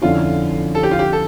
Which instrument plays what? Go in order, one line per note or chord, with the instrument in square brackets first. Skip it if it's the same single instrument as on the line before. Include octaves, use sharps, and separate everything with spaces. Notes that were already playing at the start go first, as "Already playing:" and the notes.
[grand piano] F2 D3 F3 C#4 E4 [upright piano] F4
[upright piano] A4
G4
F4
G4
A4